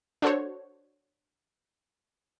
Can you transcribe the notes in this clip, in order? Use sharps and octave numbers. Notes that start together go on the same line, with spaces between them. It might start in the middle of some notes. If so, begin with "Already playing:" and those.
D4 F#4 A4 C5 C#5